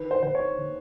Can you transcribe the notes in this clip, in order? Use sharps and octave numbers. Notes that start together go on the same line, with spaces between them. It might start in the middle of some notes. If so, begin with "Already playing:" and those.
Already playing: D#3 B4
C5
D#3 C5
C#5
D#3